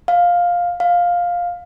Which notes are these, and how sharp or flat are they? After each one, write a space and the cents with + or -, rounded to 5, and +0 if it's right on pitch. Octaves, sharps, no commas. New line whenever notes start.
F5 +10
F5 +10